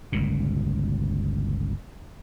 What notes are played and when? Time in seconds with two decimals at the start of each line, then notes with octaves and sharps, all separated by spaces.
0.12 G1 C#2 A#2